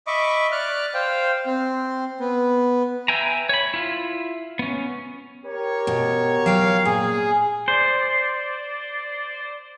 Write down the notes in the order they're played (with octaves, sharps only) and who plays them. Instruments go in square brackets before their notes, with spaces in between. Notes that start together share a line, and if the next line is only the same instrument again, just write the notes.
[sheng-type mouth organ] D#5 E5 B5 C#6 D6
D5 F6 F#6
C5 F5 G5
C4
B3
[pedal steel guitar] B4 E5 G5 G#5 A#5
C#5 B5
E4 F4
B3 C#4
[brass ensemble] G4 A#4 C#5
[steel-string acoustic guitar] B2
[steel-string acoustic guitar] F#3 G5 [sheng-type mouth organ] F5
[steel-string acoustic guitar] A#2 [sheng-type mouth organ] G#4
[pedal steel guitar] C5 [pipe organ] D5